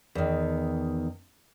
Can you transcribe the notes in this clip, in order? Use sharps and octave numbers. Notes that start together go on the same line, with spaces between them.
E2 D#3